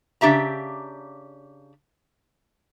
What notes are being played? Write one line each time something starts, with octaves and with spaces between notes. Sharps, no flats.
C#3 D4 G4 E5 A#5